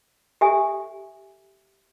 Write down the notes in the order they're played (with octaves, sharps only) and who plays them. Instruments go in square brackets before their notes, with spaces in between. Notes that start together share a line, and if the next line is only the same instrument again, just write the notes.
[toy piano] G4 A4 E5 G#5